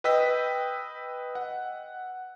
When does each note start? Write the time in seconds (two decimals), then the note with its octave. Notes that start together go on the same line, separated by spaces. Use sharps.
0.04 B4 D#5 G5 E6 B6
1.35 F#5